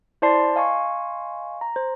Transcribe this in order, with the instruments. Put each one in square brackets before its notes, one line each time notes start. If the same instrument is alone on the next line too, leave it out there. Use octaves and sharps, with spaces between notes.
[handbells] E4 C5 D5 A5 C6 C7
D#5 F5 G#5 C6 C#6
A#5
C5